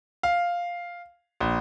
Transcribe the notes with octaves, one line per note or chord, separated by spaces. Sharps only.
F5
A#1